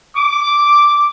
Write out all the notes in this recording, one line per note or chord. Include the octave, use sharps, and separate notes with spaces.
D6